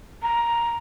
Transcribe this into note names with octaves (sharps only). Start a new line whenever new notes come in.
A#5